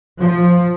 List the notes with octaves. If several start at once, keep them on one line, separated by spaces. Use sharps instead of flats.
F3